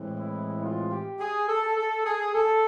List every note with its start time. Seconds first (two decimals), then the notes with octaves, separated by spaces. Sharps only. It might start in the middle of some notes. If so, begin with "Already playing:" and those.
Already playing: A2 E3 G#3 C4
0.19 E4
0.63 F4
0.91 G4
1.20 G#4
1.48 A4
1.77 A4
2.06 G#4
2.35 A4